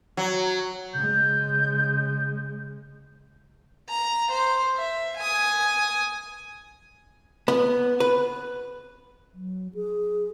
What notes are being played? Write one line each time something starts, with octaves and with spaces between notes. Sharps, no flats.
F#3
C#3 G#3 G6
A#5
C5
E5
G#5 D#6
B3
B4
F#3
G#4